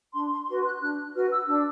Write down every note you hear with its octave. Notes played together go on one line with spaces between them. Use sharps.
D4 C6
C6
F#4 B4 C6
F#6
D4 F#6
F#4 B4 F6
E6
D4 E6